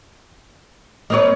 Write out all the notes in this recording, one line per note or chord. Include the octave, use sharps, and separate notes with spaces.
A#3 C4 B4 C#5 D#5